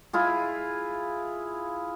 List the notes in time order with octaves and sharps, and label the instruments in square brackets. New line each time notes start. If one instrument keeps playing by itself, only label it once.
[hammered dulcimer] E4 F4 G#4